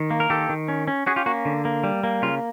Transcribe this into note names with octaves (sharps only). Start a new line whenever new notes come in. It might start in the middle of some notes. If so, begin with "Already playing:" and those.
Already playing: D#3
A#3
A#4
D#3 G4 A4
D#3
C#4
C#4
C#4 F#4 G#4
F4 G4
A#3 F#4
D3
A#3
G3
A#3
C#3 F4